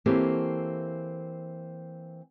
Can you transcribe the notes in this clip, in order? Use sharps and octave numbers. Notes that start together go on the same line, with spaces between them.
E3 A#3 C4 G4 A4 C#5